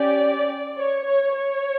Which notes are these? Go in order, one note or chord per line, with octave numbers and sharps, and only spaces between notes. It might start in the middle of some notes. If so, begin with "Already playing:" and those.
Already playing: C#4 G4 D5
C#5
C#5
C#5